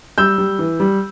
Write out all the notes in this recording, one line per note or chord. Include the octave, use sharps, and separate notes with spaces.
G3 E6 G6
G3
E3
G3